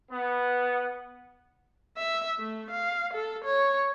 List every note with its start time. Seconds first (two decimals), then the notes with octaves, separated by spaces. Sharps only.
0.12 B3
1.97 E5
2.39 A3
2.70 F5
3.13 A4
3.44 C#5